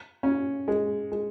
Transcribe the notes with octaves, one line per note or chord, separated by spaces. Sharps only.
C#4
G#3
G#3